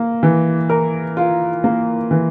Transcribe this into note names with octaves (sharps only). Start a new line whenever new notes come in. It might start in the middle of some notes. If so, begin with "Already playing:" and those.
Already playing: A#3
E3
A#4
F4
A#3
E3